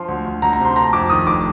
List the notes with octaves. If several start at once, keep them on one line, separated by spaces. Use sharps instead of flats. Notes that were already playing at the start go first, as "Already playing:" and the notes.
Already playing: F3 C6
D2
D2
D2 A#5
A#5
C3
C6
A3 A#5
F2 D6
D#3 D#6
F1 D6